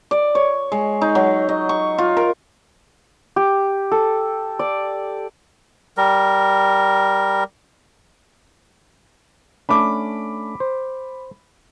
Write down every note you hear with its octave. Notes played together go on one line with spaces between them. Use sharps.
D5
C#5
G#3
D#4
F#3
D#5
C#6
F4
A#4
G4
A4
D5
G3 A#4
A3 C#4 D4 B5 D6
C5